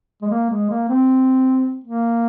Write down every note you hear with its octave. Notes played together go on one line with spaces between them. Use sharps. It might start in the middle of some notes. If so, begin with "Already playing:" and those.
G#3
A#3
G#3
A#3
C4
A#3